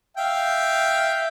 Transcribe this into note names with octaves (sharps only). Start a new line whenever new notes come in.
E5 F5 G5